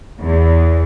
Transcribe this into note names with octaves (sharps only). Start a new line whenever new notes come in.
E2